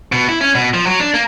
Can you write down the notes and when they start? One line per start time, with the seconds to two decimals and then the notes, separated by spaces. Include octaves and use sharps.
0.12 B2
0.29 E4
0.41 C#4
0.55 B2
0.74 F3
0.86 F#3
1.00 D4
1.14 A#3